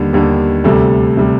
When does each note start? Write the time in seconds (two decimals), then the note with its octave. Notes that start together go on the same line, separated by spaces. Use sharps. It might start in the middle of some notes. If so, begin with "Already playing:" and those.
Already playing: D#2 D3 G3
0.13 D#2 D3 G3
0.64 D2 C3 G3 A4
1.17 C3 G3